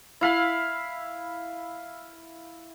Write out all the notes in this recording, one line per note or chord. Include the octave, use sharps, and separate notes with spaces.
E4 F5 B5